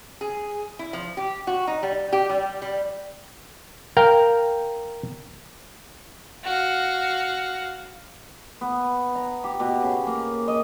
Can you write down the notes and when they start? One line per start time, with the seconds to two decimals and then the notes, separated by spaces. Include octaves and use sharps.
0.21 G#4
0.79 E4
0.93 F3
1.17 G4
1.47 F#4
1.67 D#4
1.83 G3
2.12 G4
2.29 G3
2.62 G3
3.97 A#4 F5 G5
6.44 F#4 F5
8.61 B3
9.15 A#5
9.44 G4
9.60 B2
9.82 C#3
10.07 A#3
10.48 D#5